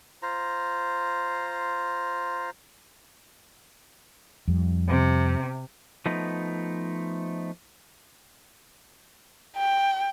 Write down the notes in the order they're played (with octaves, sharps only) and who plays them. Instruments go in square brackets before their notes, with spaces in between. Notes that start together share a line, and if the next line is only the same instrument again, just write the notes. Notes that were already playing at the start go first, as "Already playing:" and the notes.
[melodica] F4 C5 A#5
[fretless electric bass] F2 G3
[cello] C3
[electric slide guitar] F3 A3 B3 D#4
[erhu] G5